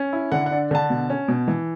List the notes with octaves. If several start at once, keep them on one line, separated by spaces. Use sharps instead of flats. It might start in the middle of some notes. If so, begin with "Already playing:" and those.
Already playing: C#4
E4
D3 F#5
D4 F#5
D3 A5
B2
C#4
B2
E3